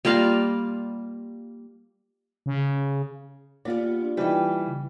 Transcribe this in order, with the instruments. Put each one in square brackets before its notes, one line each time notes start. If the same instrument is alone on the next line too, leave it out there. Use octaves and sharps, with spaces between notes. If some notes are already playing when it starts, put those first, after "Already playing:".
[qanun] G3 A#3 F4 F5
[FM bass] C#3
[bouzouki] G3 B3 [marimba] A#3 [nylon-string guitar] F4 D5
[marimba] D4 G4
[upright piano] E3 G3 [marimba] D#4 E4 D#5 [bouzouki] B4 G5
[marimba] C#3